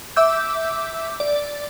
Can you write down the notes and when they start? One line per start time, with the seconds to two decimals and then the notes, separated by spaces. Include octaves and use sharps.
0.16 E5 D6 E6 G6
1.20 D5